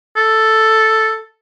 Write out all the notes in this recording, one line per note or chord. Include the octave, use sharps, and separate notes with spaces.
A4